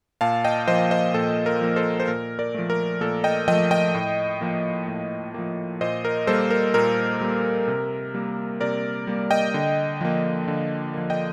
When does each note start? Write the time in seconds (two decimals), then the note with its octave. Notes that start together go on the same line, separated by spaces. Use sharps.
0.21 A#2 F5 A5
0.45 D#5 G5
0.68 F3 A#3 C5 D#5
0.91 C5 D#5
1.14 A#2 A4
1.46 A#4
1.61 F3 A#3
1.76 A4 C5
2.00 C5
2.08 A#2 A#4
2.39 A#4 D5
2.54 F3 A3
2.70 A#4
3.01 A#2 A4
3.24 D#5 G5
3.48 F3 A3 D#5 G5
3.71 D#5 G5
3.94 A2
4.41 F3 A#3
4.88 A2
5.34 F3 A#3
5.81 A#2 C5 D#5
6.05 A#4
6.27 G3 A#3 A4 C5
6.50 A#4
6.74 A#2 A#4
7.21 G3 A#3
7.68 C3
8.14 G3 A#3
8.61 C3 A#4 D5
9.07 G3 A#3
9.31 D#5 G5
9.54 D3
10.01 F3 A#3
10.48 D3
10.94 F3 A#3
11.10 D#5 G5